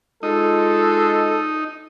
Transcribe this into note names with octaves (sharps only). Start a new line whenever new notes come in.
G#3 D#4 F4 A4